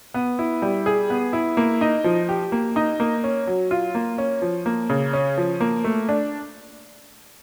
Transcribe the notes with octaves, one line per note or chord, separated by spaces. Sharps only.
B3
E4
G3
G#4
B3
E4
A#3
D#4
F3
G4
A#3
D#4
A#3
C#4
F#3
F4
A#3
C#4
F3
A#3
C#3
C#4
F3
A#3
A3
D4